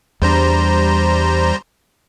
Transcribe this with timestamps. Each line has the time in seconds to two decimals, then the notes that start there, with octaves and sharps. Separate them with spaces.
0.22 E2 G3 D4 C5 A#5